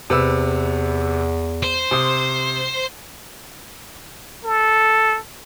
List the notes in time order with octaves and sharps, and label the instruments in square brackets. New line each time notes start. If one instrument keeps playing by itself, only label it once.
[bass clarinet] E2 [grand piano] C3 B4 E6
[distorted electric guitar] C5
[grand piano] C3 C6 D#6
[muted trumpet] A4